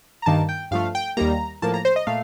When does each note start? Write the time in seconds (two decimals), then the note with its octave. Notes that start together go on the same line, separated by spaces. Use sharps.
0.22 A#5
0.26 G2 D#3 A#3 A5
0.49 G5
0.71 G2 F3 A3 F5
0.95 G5
1.17 D#2 D#3 G3 A#3 A#5
1.62 A2 F3 A#3 A5
1.74 A#5
1.85 C5
1.96 D#5
2.07 A#2 A3 F5